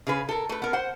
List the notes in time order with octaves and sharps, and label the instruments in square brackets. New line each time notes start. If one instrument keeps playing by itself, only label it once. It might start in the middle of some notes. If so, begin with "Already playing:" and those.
[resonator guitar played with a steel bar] C#3 G#4 B4
A4 A#4
A3 B4
B3 A#4
C5 F#5